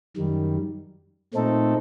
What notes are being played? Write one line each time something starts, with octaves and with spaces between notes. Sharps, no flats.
F#2 D#3 G3
A#2 A3 C4 D#4 A4